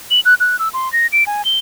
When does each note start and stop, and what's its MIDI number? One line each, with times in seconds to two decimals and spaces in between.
0.11 0.20 102
0.25 0.34 90
0.40 0.59 90
0.59 0.69 88
0.74 0.91 84
0.93 1.07 94
1.12 1.24 98
1.27 1.45 80
1.45 1.59 103